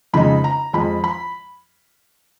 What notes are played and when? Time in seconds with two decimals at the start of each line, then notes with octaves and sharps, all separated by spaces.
0.13 F2 C#3 G#3 D#4 B5
0.44 A#5
0.73 F2 F3 G#3 B5
1.04 B5